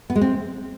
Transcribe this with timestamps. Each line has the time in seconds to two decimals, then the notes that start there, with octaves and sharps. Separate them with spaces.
0.10 B3
0.16 G#3
0.21 C4